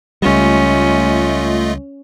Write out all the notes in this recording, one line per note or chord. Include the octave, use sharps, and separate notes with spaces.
C#2 G3 A3 C#4 F4 D#5